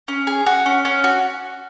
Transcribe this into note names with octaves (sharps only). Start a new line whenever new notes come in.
C#4
G#4
F#4
C#4
C#4
F#4